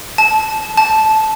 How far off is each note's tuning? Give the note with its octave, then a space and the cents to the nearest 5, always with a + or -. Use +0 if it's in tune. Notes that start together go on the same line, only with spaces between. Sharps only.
A5 -20
A5 -10